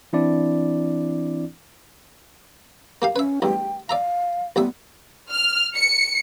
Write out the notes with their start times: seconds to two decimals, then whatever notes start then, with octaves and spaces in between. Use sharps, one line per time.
0.13 E3 C4 D4 E4 D5
3.02 A#3 G4 F5
3.16 C#4 B4 E5
3.42 A1 E2 G2 G5
3.89 D5 E5 F5 A#5
4.56 A1 G3 B3 E5
5.30 F6
5.75 C#7